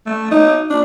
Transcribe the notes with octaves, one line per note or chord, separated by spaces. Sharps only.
A3
D#4
D4